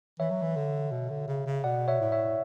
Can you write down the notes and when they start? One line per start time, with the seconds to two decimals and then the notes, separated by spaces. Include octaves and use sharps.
0.19 E3 C#5 E5
0.30 F#3
0.42 E3
0.56 D3
0.92 B2
1.10 D3
1.27 C#3
1.46 C#3
1.64 B2 D5 F#5
1.88 C#5 E5
2.00 A2
2.12 C#5 E5